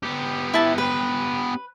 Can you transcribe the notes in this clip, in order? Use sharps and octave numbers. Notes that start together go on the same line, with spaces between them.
B3 G4
E4 A5
B4